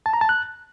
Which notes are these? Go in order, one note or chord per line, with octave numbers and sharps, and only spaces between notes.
A5
A#5
A5
F#6